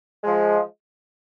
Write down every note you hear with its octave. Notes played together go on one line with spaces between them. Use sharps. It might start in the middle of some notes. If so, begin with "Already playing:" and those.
F3 G#3